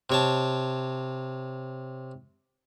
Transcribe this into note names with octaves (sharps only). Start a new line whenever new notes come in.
C3 C#5 A5